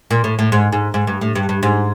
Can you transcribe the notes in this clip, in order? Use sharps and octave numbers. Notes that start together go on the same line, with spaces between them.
A#2
A2
A2
G#2
G#2
G#2
G2
A2
G2
G2
G#2